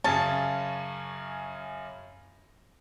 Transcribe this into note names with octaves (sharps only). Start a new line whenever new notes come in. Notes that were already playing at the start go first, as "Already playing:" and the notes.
F#2 C#3 C#4 A5